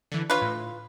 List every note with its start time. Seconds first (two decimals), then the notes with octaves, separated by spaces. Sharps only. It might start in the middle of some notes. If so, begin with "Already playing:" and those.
0.12 D3 E3
0.30 D4 F4 B4 C#5
0.42 A2